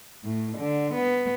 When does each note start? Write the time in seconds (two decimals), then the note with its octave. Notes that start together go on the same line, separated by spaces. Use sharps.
0.25 A2
0.58 D3
0.94 B3